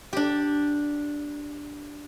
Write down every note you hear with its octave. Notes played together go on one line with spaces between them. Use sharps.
D4 G4